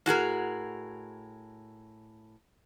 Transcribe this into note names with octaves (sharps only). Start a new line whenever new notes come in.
A2 F#4 G#4 A#4